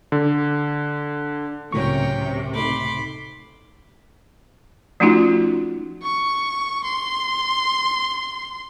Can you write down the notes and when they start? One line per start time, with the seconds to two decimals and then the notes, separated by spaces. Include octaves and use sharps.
0.12 D3
1.73 C#2 A2 C3 F#3 C#4 A#4 G5 C#6
2.54 A3 D#4 B5 C6 D6
5.00 F3 A3 C#4 D#4 F4 F#4
6.03 C#6
6.84 C6